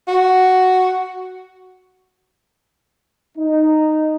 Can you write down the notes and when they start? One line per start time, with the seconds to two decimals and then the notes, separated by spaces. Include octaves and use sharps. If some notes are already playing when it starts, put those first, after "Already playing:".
0.08 F#4
3.37 D#4